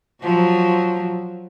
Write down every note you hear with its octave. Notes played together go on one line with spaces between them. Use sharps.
F3 F#3